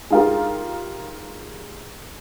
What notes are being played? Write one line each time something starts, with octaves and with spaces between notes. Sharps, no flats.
G#3 D#4 F4 G4 A#4